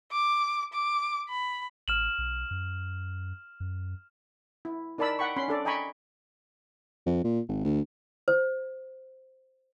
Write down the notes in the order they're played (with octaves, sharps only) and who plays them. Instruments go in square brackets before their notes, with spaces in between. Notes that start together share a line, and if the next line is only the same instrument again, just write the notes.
[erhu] D6
D6
B5
[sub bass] A1 [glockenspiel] F6 E7 F#7
[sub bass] B1
F#2
F#2
[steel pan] E4
D#4 A#4 D5 A5 B5 E6
F#5 G5 B5 C#6
C#4 B5 C6
D4 A4 D5
D#5 G5 G#5 A#5 B5 C#6
[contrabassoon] F2
A#2
G#1
D2
[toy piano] C5